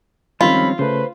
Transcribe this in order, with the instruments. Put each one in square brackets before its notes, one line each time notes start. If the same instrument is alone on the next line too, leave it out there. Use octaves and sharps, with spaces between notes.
[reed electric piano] D#3 F3 G#3 [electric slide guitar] G3 C4 C#4 [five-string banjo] F4 [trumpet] B5
[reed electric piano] C#3 A3 [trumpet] B4 [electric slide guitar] C5